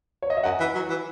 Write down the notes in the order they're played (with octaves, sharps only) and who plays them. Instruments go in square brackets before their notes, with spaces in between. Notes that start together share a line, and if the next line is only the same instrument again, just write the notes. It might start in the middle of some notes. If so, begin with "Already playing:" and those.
[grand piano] C#5
D#5
E5
[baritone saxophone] F#2 [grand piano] F#5
[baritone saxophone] E3
F#3
E3